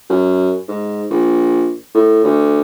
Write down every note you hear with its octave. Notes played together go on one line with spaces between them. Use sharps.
F#2
G#2
A#1
A2
D2